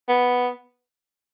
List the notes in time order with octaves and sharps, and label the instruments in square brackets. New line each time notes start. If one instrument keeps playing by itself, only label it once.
[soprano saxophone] B3